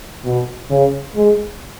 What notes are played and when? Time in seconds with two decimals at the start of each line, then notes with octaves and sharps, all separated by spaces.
0.24 B2
0.70 C#3
1.15 G#3